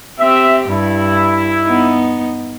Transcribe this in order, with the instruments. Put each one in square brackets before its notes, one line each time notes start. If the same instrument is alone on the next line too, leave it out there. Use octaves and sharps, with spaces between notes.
[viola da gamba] C4 G4 [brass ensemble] E5
[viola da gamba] G2 [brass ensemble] E4
[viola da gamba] B3 D#4